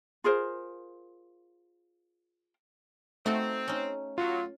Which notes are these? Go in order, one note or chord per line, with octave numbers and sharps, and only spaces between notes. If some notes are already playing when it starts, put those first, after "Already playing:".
F4 G#4 A#4 C5
A3 C4 D#4 F#4 A4
C#4 D#4
F#3 F4